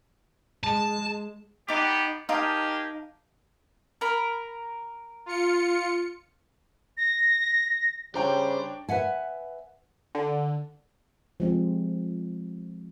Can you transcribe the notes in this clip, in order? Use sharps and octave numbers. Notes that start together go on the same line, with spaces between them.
G#3 A5
B3 D4 D#4 G4 D6
D#4 G4 G#4 A#4 F5 A5
A#4 B5
F4 C#7
A#6
C#3 G3 D4 C5 C#5 G5 A#5
B4 E5 F#5 G#5
D3
F3 G#3 C4